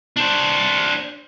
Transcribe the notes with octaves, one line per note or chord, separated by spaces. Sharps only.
D4 C5